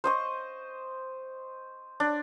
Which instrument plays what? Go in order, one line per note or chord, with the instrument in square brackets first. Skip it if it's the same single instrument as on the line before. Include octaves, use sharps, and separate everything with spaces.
[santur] C5 D#5 C#6
D4